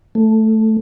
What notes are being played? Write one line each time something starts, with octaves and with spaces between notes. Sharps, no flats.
A3